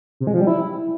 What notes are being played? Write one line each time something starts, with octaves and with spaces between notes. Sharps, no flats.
C3
G#3
F3
G3
E4